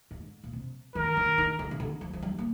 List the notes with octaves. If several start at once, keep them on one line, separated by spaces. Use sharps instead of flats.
G#2
A#2
C3
D#3 A#4
D#3
D#3
D3
C3
D3
F3
F3
G3
A#3